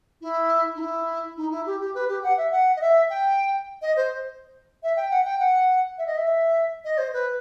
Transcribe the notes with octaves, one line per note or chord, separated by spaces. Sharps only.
E4
D#4
E4
D#4
E4
G4
G4
B4
G4
F#5
E5
F#5
D#5
E5
G5
D#5
C5
E5
G5
F#5
G5
F#5
E5
D#5
E5
D#5
C5
B4